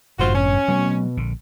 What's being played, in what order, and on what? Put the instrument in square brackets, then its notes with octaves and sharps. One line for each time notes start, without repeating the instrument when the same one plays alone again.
[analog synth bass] G1 [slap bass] F#2 A2 C3 [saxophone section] F4 F#4 C5
[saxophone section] C#4
[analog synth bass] B2 [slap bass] F#3 A3 C4
[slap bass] A#1 D3